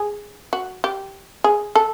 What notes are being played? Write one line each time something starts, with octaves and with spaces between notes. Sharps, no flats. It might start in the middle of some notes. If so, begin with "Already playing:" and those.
Already playing: G#4
F#4
G4
G#4
A4